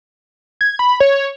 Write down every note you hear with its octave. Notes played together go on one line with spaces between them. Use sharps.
G#6
B5
C#5